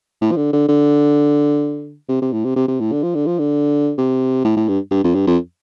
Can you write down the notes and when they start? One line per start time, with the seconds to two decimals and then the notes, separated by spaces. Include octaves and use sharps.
0.22 A2
0.31 F3
0.37 D3
0.53 D3
0.69 D3
2.09 C3
2.22 C3
2.32 A2
2.45 C3
2.56 C3
2.68 C3
2.80 A2
2.92 D3
3.03 F3
3.15 D3
3.26 F3
3.39 D3
3.98 C3
4.45 A2
4.57 A2
4.68 G2
4.91 G2
5.04 F2
5.15 G2
5.27 F2